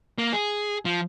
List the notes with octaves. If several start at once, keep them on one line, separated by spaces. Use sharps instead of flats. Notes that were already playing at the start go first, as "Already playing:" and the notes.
A#3
G#4
F3